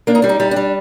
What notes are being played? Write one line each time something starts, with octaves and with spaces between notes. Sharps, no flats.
A#3 D4
D#4
G3 D4
D#4
G3
D4
G3